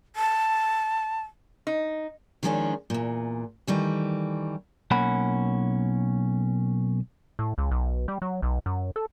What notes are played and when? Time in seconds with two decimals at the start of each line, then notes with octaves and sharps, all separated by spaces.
0.16 A5
1.67 D#4
2.43 D#3 F3 G#3 A3 C#4 D4
2.90 E2 A#2
3.67 D#3 E3 G3 A3
4.91 B1 A#3 C#4 F#5 B5
7.39 A2
7.58 C#2
7.71 B1
8.08 G3
8.22 F#3
8.42 B1
8.66 F#2
8.96 A4